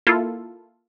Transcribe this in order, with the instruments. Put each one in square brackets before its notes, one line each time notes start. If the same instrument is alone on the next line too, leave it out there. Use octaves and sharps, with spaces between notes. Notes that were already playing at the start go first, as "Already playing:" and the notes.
[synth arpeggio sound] A#3 E4 F4 A4